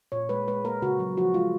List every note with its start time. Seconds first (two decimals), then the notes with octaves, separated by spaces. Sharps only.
0.12 A#2 C#5
0.29 G#3 B4
0.48 G#3 B4
0.64 A#3 A#4
0.82 C#3 F#4
0.99 F#3
1.17 F3 F#4
1.34 G#3 F4